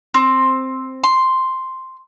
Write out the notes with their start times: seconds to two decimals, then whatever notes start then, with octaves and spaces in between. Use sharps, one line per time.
0.14 C4
1.04 C6